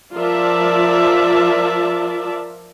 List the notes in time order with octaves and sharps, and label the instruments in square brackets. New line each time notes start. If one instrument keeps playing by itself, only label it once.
[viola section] F3 F4 A#4 D5 E5 A5